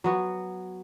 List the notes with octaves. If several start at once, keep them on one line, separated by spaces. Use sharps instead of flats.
F#3 B3 F#4